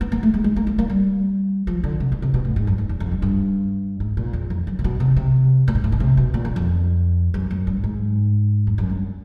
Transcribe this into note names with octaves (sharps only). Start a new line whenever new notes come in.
B3
A#3
A3
G#3
G#3
A#3
A#3
A#3
G3
F3
D3
C3
B2
C3
B2
A2
G#2
F#2
F2
E2
F2
G2
G2
G#2
A#2
E2
F2
F#2
C3
B2
C3
C3
A#2
G#2
A2
B2
C3
B2
A#2
E2
F2
F#2
F#2
G2
G#2
F2
F#2
G2